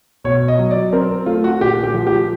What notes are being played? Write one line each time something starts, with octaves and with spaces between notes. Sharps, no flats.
B2 C#5
D#5
F#3
D5
C4 A#4
A3 F4
F#4
A#2 G4
G4
F3
G4